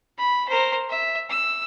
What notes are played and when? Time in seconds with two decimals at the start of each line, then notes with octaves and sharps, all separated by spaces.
0.18 B5
0.48 A#4 C5
0.90 E5
1.29 E6